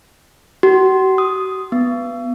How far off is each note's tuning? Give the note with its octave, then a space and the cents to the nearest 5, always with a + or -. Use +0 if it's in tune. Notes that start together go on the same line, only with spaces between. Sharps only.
F#4 +40
D#6 +5
B3 +0